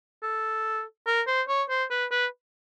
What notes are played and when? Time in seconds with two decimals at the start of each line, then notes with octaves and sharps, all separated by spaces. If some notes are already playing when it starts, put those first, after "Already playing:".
0.23 A4
1.06 A#4
1.27 C5
1.48 C#5
1.69 C5
1.90 B4
2.11 B4